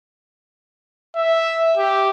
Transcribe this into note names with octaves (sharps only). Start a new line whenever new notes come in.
E5
G4